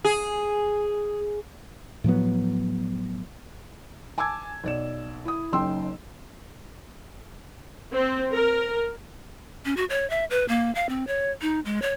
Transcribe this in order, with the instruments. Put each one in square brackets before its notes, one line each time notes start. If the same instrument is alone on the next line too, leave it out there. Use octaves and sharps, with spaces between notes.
[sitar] G#4
[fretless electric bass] A2 F3 F#3 B3
[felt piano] G#5 A5 D6 E6 G#6
B1 D5 E7
E4 D#6
F#1 F#2 D#4 G5 C6 E6
[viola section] C4
A#4
[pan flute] C#4
F#4
C#5
E5
B4
A#3
F5
C4
C#5
D#4
G#3
C#5